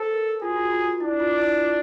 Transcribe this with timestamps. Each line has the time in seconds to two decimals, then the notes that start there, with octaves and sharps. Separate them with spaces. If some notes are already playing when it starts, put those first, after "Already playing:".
Already playing: A4 C5
0.13 A#4
0.42 F4 G#4
0.50 F#4
0.56 F4
0.64 F#4
0.72 F4
0.79 F#4
0.86 F4
1.01 D4 E4
1.20 F4
1.40 E4
1.59 F4